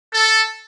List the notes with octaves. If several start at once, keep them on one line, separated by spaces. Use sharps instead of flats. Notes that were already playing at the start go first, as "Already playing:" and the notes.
A4